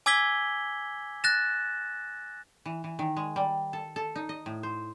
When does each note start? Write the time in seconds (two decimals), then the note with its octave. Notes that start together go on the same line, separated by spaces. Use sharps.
0.06 G#5 D6 E6 G#6 B6 G7
1.24 F#6 A6 A#6 E7
2.66 E3
2.84 E3
2.99 D#3
3.17 G#3
3.36 G3
3.73 A4
3.96 A4
4.15 D#4
4.29 D#5
4.46 A2
4.63 C5